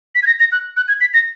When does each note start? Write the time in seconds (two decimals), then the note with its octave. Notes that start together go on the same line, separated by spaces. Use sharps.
0.15 B6
0.23 G#6
0.27 A#6
0.40 A#6
0.52 F#6
0.77 F#6
0.88 G#6
1.01 B6
1.14 A#6